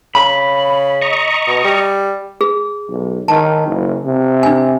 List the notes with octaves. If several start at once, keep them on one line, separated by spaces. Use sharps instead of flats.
C#3 B5
D#5 A#5 C#6
B2
G3
G#4
B1
D#3 A5
F#1
C3
D4 G#5